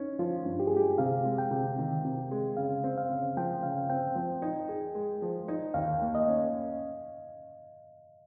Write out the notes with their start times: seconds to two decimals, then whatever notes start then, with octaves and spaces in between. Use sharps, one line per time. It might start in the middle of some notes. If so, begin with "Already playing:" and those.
Already playing: C#4 D#4
0.19 F3 F4
0.46 G2
0.60 G4
0.67 G#4
0.72 G#3 G4
0.98 C3 F5
1.25 G#3
1.38 G5
1.51 C3
1.78 D#3
2.05 C3
2.31 G#3
2.57 C#3 F5
2.84 C4
2.98 F5
3.10 C#3
3.37 F3 G5
3.63 C#3 F5
3.90 C4 G5
4.15 F3
4.42 D#4
4.69 G#4
4.95 G#3
5.22 F3
5.48 D#4
5.74 D#2 F5
6.01 A#3
6.15 D#5
6.28 C#4